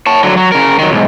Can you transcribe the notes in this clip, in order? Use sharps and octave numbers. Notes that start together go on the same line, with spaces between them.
C#5 A5
D3 F#3
F#3
C#3 A#4
D#3 F#3
B1 G#2